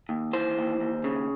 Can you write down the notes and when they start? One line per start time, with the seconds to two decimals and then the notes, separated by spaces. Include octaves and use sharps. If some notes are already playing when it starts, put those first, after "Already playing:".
0.09 D#2
0.33 E3 C5
0.57 D#2
0.80 D#2
1.04 C#3